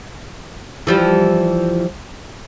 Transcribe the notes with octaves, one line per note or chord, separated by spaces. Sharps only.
E3 F3 G3